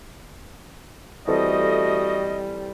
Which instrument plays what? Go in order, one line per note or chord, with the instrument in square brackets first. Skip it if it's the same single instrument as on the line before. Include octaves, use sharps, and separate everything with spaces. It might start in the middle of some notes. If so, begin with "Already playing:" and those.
[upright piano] E3 C4 A4 [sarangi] G3 [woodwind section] A3 F#4 D#5